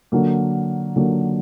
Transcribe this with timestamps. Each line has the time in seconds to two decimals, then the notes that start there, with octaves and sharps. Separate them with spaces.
0.12 D3 F#3 A#3
0.96 D3 F#3 A#3